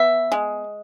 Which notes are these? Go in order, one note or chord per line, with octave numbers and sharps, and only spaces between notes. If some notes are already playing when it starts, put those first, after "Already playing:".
Already playing: B3 E5
G#3